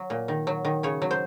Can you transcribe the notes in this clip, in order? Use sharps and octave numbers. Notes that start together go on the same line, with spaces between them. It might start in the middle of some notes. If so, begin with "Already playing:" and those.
Already playing: F#3
A#2
D#3
F#3
D#3
C#3 C#5
F#3
C5